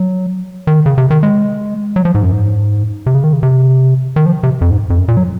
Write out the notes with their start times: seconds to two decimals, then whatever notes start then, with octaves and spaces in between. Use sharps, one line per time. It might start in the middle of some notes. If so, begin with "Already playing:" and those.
Already playing: F#3
0.67 D#3
0.86 C#3
0.98 C3
1.10 D#3
1.23 G#3
1.96 F#3
2.05 F3
2.15 G#2
2.23 F#2
2.32 G#2
3.06 C3
3.15 C#3
3.24 D#3
3.33 C#3
3.43 C3
4.16 D#3
4.26 F3
4.43 C3
4.61 F2
4.71 G#2
4.90 F2
4.98 F#2
5.08 A#2
5.17 F#3